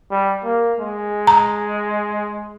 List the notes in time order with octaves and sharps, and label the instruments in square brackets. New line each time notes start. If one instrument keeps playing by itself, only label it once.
[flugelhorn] G3
A#3
G#3
[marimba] A#5